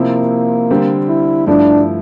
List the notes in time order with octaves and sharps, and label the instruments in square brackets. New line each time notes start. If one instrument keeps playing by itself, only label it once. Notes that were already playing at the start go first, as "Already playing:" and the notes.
Already playing: [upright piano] C3 F3 C4 E4 [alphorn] A#3
[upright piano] D3 G3 C4 G4
[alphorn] E4
[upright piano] G2 F3 A3 E4 [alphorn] D4